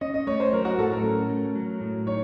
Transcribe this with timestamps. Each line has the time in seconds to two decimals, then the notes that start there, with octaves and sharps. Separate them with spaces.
0.01 C#4 D#5
0.14 D#5
0.27 A3 C#5
0.40 C5
0.53 F#3 A#4
0.65 F#4
0.78 A2 A4
0.91 A#4
1.03 C#4
1.30 A3
1.55 F#3
1.80 A2
2.07 D#4 C#5